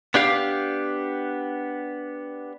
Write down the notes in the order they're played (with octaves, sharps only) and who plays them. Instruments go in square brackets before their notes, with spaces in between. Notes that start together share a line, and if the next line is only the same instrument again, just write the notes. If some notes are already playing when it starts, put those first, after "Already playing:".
[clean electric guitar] B3 D4 G4 F5